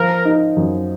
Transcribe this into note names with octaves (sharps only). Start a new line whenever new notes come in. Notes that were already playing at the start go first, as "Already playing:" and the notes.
Already playing: F3 A#4
D#4
F#2